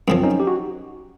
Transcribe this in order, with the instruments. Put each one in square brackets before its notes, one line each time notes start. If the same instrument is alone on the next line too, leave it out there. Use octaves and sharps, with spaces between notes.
[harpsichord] F#2 C#3 F3 [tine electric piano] C4
[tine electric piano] C#4 D#4
G4
F#4